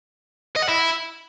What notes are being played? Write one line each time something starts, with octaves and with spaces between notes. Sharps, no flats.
D#5
F#5
E4